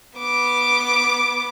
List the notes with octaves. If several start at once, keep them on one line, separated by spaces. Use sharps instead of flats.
B3 D6